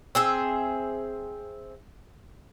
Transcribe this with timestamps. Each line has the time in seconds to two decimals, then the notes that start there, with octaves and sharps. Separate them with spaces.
0.15 C4 G#4 E5